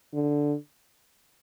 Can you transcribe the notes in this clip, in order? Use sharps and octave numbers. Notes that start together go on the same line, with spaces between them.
D3